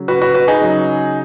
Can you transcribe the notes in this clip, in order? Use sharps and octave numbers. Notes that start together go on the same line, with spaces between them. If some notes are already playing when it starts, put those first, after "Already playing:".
Already playing: C#3 F#3
F#4 B4
F#4 B4
F#4 B4
D#4 G#4
C#3 F#3